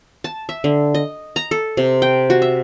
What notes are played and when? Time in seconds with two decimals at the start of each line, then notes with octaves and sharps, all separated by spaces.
0.24 A5
0.49 E5
0.64 D3
0.94 D#5
1.36 A#5
1.51 A4
1.77 C3
2.02 G5
2.30 F#4
2.42 E5